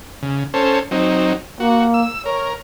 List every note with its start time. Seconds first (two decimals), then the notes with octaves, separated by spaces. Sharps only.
0.23 C#3
0.54 C#4 A4 C5
0.91 F#3 C4 D#4
1.60 A#3 F#4
1.94 E6
2.26 A#4 C#5